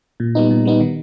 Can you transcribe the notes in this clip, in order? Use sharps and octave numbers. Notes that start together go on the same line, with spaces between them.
A#2
G3 B3 D#4
A#2
G3 B3 D#4
D#3